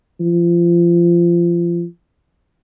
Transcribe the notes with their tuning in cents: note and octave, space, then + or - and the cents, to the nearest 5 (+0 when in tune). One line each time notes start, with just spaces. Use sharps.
F3 -25